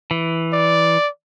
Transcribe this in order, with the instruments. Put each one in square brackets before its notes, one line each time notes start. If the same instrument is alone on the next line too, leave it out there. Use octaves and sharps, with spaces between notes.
[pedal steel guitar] E3
[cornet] D5